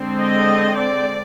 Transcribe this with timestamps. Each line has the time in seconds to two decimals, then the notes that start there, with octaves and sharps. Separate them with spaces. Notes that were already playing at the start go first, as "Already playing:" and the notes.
Already playing: D3 G#3 C4
0.20 D#5
0.78 D5